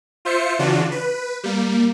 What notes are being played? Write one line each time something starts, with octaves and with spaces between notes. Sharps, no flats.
F4 C5 E5 C#7
C#3 E3 D4 F4 F#4
B4
G3 A#3